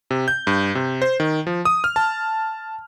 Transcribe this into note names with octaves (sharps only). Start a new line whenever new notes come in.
C3
G6
G2
C3
C5
D#3
F3
D#6
F6
A5